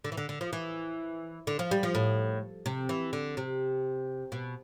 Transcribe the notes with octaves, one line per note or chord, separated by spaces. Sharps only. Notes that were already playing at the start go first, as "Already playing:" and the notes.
D3
E3
D3
D3
F3
E3
D3
F3
G3
F3
A2
C3
E3
D3
C3
B2